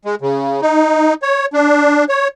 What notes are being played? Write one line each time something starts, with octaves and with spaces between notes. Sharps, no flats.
G#3
C#3
D#4
C#5
D4
C#5